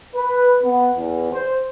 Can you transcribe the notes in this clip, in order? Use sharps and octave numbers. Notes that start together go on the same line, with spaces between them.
B4
B3
E2
C5